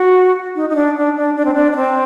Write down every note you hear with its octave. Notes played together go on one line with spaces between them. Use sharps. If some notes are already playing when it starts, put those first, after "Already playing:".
Already playing: F#4
D#4
D#4
D4
D4
D4
D4
C4
D4
D4
C4